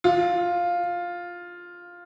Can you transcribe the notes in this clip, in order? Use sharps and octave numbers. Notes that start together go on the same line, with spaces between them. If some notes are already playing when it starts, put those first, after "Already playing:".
F4